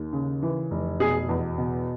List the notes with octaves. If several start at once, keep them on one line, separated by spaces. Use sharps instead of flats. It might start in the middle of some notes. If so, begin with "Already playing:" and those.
Already playing: D#2
C#3
E3
F1
B2 G#4
E2
B2